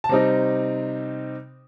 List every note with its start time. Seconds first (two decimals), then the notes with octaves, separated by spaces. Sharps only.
0.04 A5
0.09 C3 G3 C4 D#4 A#5